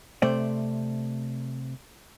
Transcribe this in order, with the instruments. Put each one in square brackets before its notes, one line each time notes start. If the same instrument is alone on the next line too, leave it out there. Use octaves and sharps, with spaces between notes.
[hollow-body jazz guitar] C3 A3 C5 D5